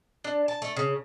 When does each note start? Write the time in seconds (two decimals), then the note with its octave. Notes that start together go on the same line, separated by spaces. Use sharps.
0.24 D4
0.48 A5
0.62 A3
0.76 C#3